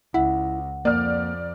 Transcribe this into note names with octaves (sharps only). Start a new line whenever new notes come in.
C#2 E4 F#5
F2 A#3 D5 F6